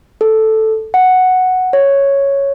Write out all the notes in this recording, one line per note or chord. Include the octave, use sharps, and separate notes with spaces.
A4
F#5
C#5